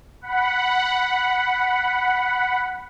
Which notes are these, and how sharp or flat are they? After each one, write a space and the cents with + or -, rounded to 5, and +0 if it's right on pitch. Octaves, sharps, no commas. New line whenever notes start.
F#5 +0 B5 +0